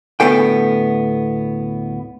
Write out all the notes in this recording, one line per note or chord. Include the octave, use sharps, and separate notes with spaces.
D2 A2 B3 A4 G5